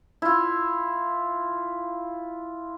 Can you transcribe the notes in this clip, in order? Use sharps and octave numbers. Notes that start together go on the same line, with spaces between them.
E4 F4